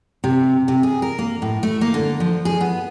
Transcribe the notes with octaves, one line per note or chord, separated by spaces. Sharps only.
C3
C3
G#4
A#4
A#3
A2
A3
A#3
D3
F3
G#4
B3